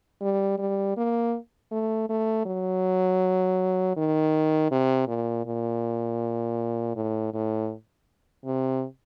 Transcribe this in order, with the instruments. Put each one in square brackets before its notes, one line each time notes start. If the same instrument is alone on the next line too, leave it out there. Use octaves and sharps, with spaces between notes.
[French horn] G3
G3
A#3
A3
A3
F#3
D#3
C3
A#2
A#2
A2
A2
C3